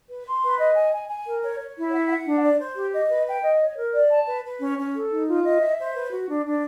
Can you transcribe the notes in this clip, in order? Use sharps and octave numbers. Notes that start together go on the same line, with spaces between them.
B4
C6
B4
D#5
G#5
G#5
G#5
A#4
C#5
C#5
E4
F#5
F#5
D4
D5
C5
G4
D#5
B4
G5
D#5
C#5
A#4
D5
A5
B4
B4
C#4
C#4
A4
D#4
F4
D#5
E5
C5
B4
F#4
D4
D4